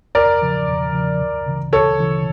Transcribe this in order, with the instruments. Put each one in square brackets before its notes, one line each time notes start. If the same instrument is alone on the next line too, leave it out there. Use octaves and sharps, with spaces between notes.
[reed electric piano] E2 [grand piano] A#4 D5
[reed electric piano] C#3 F3
E2
C#3 F3
D2
C#3 E3
[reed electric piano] D2 [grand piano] A4 C#5
[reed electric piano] C#3 E3